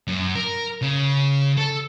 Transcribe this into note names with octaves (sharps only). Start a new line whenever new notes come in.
F#2
A#4
C#3
A4